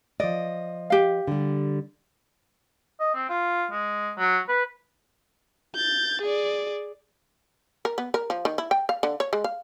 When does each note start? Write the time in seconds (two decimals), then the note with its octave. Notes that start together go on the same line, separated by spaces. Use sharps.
0.20 F3 D5 D#5
0.90 G4 F5
1.28 D3 G3
3.00 D#5
3.15 C4
3.29 F4
3.71 G#3
4.18 F#3
4.49 B4
5.75 G6 A6
6.22 G#4 D5
7.85 A#4
7.98 B3
8.14 A#4
8.30 F3
8.45 D#3
8.58 E4
8.71 G5
8.89 F5
9.03 D3
9.20 C#5
9.33 G#3
9.44 F5